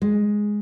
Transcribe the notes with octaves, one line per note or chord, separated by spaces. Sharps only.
G#3